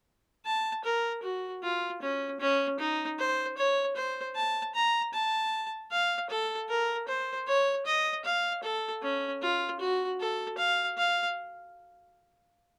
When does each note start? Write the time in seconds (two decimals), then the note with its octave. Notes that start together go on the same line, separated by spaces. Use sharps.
0.46 A5
0.85 A#4
1.23 F#4
1.63 F4
2.02 C#4
2.40 C#4
2.79 D#4
3.19 C5
3.58 C#5
3.96 C5
4.36 A5
4.75 A#5
5.14 A5
5.91 F5
6.30 A4
6.69 A#4
7.08 C5
7.47 C#5
7.87 D#5
8.25 F5
8.63 A4
9.03 C#4
9.42 F4
9.80 F#4
10.20 A4
10.58 F5
10.98 F5